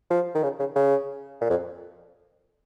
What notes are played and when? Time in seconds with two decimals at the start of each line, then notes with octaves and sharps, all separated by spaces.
0.10 F3
0.35 D#3
0.43 C#3
0.60 C#3
0.76 C#3
1.41 A#2
1.50 F2